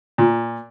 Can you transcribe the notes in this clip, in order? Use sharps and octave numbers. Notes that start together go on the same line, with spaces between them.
A#2